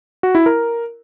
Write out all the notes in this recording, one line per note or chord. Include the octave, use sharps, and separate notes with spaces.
F#4
E4
A#4